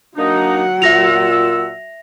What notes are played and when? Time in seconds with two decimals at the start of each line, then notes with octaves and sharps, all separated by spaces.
0.18 F#3 A#3 D4 D#4 F#5
0.82 A#2 F4 E5 E6 A#6 F7